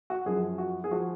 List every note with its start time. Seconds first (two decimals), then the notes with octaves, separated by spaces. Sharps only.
0.10 F#4
0.26 F#2 F3 G#4
0.58 F#4
0.84 G#4
0.91 F3 F#4